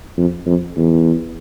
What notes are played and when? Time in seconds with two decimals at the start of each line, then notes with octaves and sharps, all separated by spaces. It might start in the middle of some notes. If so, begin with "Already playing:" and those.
0.17 F2
0.46 F2
0.76 E2